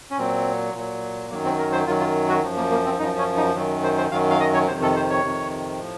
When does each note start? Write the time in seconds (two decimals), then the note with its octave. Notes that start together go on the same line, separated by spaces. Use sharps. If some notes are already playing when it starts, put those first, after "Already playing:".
0.11 C#4
0.18 A#2 F#3 C4
0.74 A#2 F#3
1.30 F#2 D#3 F#3 A#3
1.45 C4
1.58 A#4
1.72 C5
1.86 F#2 D#3 F#3 F4
2.00 F4
2.29 F#4
2.43 F#2 F3
2.57 A#3
2.71 A#3
2.85 C4
2.99 F#2 F3 D#4
3.18 C#4
3.37 D#4
3.55 F#2 D#3 F#3
3.83 C5
3.98 C5
4.11 F#2 D#3 F#3 F5
4.30 F5
4.40 D#5
4.54 C#5
4.67 F2 C3 D#3 C5
4.82 A4
4.96 C5
5.10 C#5
5.24 F2 C3 D#3
5.80 A2 F3